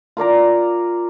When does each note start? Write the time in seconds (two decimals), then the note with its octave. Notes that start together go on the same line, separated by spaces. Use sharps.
0.17 F4 A#4 D5 A#5